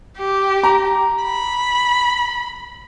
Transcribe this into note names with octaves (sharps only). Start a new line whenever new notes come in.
G4
A#5
B5